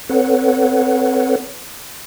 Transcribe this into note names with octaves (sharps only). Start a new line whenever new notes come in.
C4 A4 B4 C#5 F#5